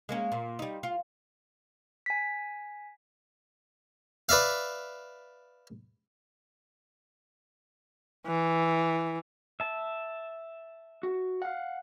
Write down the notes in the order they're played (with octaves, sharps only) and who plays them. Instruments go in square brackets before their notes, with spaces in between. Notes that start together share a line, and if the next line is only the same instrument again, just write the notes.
[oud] G#3 A#3 C#4
A#2
G3 D#4
F4
[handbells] G#5 B6
[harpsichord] B4 D5 E5 F5
[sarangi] E3
[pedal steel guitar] E5 A5
[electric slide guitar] F#4
F5 F#5